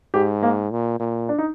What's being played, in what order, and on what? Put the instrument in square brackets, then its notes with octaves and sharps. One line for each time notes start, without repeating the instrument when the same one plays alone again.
[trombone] G#2 [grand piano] G4
[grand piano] A#3
[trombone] A#2
A#2
[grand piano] D4
D#4